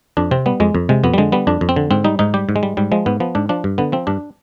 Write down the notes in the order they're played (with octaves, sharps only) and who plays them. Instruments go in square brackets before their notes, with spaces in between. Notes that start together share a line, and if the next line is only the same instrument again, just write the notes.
[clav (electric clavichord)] F2 D4
C3 C4
G3 B3
F2 G#3
F2
C3 G#3
F2 B3
G3
D3 G#3
G3 B3
F2 D4
F2
C4
D3
G#2 C4
G3 D#4
G#2 D#4
G3 G4
G#2
G#3
G3
G#2 G3
F3 G#3
G#2 B3
F3 B3
G#2 D4
F3 D4
G2
D3 B3
F3 C4
G2 D4